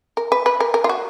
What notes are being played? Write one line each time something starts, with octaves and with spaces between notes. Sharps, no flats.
A#4
B4
B4
A#4
A#4
F4
F#4